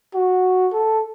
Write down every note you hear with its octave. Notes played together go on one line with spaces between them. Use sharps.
F#4
A4